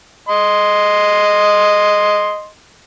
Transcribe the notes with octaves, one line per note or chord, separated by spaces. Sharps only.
D#5 C6